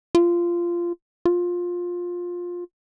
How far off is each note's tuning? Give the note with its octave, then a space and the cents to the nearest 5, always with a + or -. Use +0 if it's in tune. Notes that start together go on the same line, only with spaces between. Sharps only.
F4 -15
F4 +15